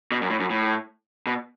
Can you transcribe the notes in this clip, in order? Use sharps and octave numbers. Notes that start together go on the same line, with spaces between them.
B2
F#2
A2
F#2
A2
B2